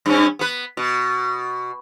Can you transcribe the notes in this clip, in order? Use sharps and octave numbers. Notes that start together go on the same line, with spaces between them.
G2 C#4
B3 B4
B2